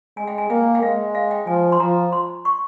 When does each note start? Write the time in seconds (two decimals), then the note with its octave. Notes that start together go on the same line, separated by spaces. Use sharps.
0.17 G#3 G#5
0.27 G5
0.38 G#5
0.50 A#3 G5
0.75 G5
0.82 G#3 F5
1.15 F5
1.31 G5
1.47 F3 G#5
1.72 C6
1.80 F3 A#5
2.13 C6
2.45 C#6